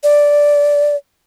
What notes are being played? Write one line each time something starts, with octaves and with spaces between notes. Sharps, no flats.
D5